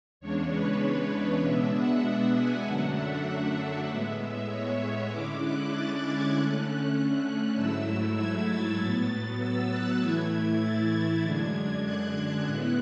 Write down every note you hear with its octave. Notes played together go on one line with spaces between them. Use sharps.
E2 C#3 G#3 D4 C#5
B4
B2 G#3 B3 D4 E5
F#5
F#5
G#5
F#2 D3 F#3 A3 D4 F#5
E5
E5
A2 G#3 B3
C#5
E5
D3 G#3 C#4 E4 D6
F#6
A6
G#6
D3 A3 C#4 F#6
G#2 F#3 A3 E4 E6
G#6
A6
A2 F#3 B3 A6
E6
F#6
A2 E3 A3 E4 G#6
G#6
A6
F#2 D3 G#3 D4 G#6
G#6
F#6
A2 G#3 B3 E4